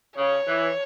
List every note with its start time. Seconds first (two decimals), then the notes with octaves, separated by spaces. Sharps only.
0.17 C#3 C#5
0.48 E3